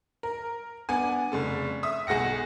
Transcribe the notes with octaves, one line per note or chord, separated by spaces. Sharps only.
A#4
B3 D4 G#5
F1 C#3 A4
E5 D#6
B1 G#4 F#5 A#6 C#7